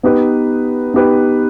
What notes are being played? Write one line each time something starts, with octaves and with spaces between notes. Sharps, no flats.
B3 D#4 G4 B4
B3 D#4 G4 B4